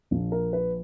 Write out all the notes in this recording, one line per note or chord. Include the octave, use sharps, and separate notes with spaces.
A#1 A#2 F3
A#4
B4